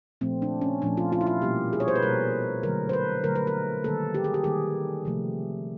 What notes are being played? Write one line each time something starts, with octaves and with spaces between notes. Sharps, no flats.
A#2 F3 A3 C4
D4
C#4
A#2 F3 A3 D4
F4
F4
E4
F4
B2 G3 A#3 G4
G#4
C#5
C5
B4
B2 G3 A#3 A#4
D3 F#3 A3 A#4
C5
B4
D3 F#3 A3 A#4
B4
A#4
D#3 G3 A#3 A4
G4
G#4
G4
D#3 G3 A#3 G#4
C3 F3 A3